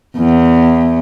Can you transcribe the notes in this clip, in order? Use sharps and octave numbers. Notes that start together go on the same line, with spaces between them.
E2